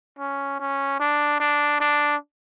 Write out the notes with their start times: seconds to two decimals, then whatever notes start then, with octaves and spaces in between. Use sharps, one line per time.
0.19 C#4
0.60 C#4
1.00 D4
1.40 D4
1.80 D4